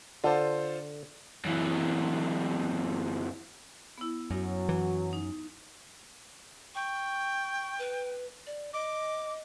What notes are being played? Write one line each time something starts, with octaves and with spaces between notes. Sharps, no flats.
D3 F4 A4 C5
F#2 E3
B3 E4
F#2 F#3
E3
D#4
G5 C#6
B4
D5
D#5 D6